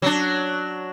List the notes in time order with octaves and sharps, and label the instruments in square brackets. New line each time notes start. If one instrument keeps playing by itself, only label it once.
[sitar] F#3 D4